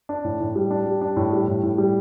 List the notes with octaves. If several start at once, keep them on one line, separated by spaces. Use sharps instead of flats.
D4
A2
A2
G3
D4
G3
D4
A2
G3
A2
A2
G3